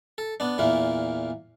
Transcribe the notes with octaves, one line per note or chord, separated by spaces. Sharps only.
A4
B3 D4
E2 A#2 A#3 E4